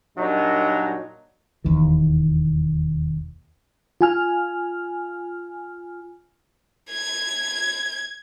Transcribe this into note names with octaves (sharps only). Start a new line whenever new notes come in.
F#2 A#2 F#3 G3 D4 D#4
E1 D#2 E3
F4 G#5 F6
G#6